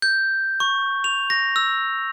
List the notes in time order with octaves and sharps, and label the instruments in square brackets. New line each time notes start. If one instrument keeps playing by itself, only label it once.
[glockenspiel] G6
C#6
F7
A#6
E6